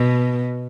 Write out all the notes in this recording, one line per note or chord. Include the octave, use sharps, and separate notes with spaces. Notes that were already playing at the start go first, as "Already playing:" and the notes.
Already playing: B2